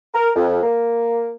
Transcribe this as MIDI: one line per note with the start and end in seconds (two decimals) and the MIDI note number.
0.14 0.30 70
0.36 0.60 41
0.63 1.33 58